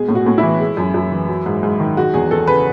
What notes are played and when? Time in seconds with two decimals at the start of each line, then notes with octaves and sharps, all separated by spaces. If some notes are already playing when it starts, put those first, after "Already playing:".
Already playing: B2 G#3 G#4
0.09 A2
0.15 F#4
0.26 A2
0.38 E4
0.43 E3
0.60 G#3
0.77 F#2
0.94 F#2
1.11 E3
1.28 F#3
1.46 G#2
1.63 G#2
1.80 D#3
1.96 G#3 F#4
2.14 E2 G#4
2.31 E2 A4
2.47 C#3 B4